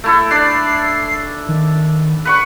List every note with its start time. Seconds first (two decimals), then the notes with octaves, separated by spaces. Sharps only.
0.04 A3 E4 A4
0.31 D4 D5 C7
1.48 D#3
2.25 B4 F#5 C#6